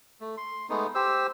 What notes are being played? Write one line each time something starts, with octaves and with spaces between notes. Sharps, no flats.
A3
C6
G#3 A3 B3 D#4
G4 C5 E6